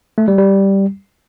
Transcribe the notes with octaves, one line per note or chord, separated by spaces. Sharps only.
A3
G3
G3